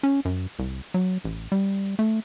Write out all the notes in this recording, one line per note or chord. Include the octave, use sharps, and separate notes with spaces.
C#4
F#2
C2
F#3
A1
G3
A3